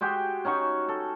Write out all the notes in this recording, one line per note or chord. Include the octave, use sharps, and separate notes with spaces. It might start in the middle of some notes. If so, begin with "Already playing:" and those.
G#3 F#4 G4 G5
C#4 D#4 F#4 C#6
A4